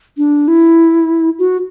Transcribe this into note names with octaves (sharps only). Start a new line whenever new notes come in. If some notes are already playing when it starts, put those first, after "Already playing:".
D4
E4
F#4